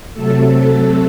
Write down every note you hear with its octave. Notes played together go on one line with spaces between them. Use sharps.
C3 F#3 A3 A4